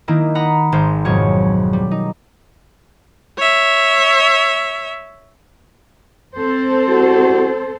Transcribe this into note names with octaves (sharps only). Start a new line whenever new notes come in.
D#3 A#3 D#4 E4
F#5 A#5 B5 D#6
G#1 C5
F2 G#2 B2 F#3 G#4 C#5
G3
D#4
C#5 E5
C4 A4 C5
G3 E4 F#4